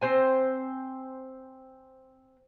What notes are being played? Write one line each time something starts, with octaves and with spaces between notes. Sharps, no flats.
C4 C5 G#5